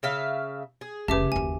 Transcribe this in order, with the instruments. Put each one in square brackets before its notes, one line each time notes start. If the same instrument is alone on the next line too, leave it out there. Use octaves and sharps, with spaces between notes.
[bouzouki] C#3 E5 F5
G#4
[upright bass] F1 C#3 [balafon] C#4 B4 [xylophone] G4 E5 D6
[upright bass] F#1 D#2 [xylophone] G#5